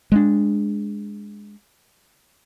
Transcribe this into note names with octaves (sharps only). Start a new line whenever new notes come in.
G#3 A#3 D4